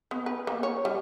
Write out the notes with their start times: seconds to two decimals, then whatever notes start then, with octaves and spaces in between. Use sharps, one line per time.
0.11 B3
0.26 B4
0.47 A#3
0.63 C#5
0.85 G3